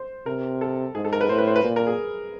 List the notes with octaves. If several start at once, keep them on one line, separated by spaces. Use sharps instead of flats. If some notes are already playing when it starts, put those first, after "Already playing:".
Already playing: C5
C3 A#4
A4
G#2 G#4
A4
A#4
B4
A2 C5
B4
C5
B4
A#2
A#4
G#4